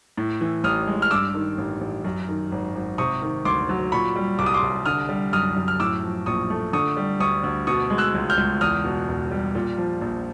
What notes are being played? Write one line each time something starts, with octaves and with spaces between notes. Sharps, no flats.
A2
E3
A1 D#6 F6
G#3
F6
G2 D6 E6
D#3
A1
A1
F#2
D#3
G#1
G#1
C3 C#6 D#6
D#3
D2 C6 D6
F#3
A#2 B5 C#6
G3
C2 D6
D#6
C6 D6
C2
D3 D#6 F6
G3
F#2 D#6 F6
F#2
F6
A2 D6 E6
F3
A#1 C#6 D#6
A3
D3 C#6 D#6
G3
D2 C#6 D#6
D2
B2 C#6 D#6
G#3
E6 F#6
C#2
F6 G6
C#2
E2 D#6 F6
B2
E1
G3
A#2
F3
A#1